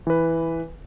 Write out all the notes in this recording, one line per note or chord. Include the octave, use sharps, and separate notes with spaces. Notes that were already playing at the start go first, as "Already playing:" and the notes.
E3 B4